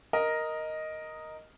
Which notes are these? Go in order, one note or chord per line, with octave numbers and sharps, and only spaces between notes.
A#4 D#5